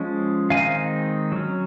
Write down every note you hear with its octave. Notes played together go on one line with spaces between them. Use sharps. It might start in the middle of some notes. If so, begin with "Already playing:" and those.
Already playing: F3 G#3 C#4
D#3 G#3 C4 D#4 F5 G#5
F#3 C#4